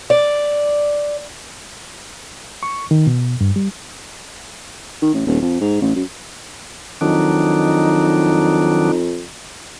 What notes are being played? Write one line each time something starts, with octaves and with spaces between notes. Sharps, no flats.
D5
C#6
D#3
B2
G2
G3
D#3
A1
D#1
F2
G#2
A1
F#2
F2 D#3 F#3 D4 D#4